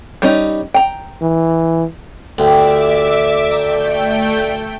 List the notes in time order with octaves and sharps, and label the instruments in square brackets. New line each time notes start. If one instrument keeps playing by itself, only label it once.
[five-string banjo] G3 C#4 D#4
G5 A#5
[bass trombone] E3
[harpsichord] D2 [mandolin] G4 G5 D#6 [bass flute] D5 [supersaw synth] E5 D6
[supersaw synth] A3 G5 [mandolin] A#4